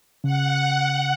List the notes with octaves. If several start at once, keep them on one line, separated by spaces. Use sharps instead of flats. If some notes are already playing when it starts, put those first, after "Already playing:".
C#3 F#5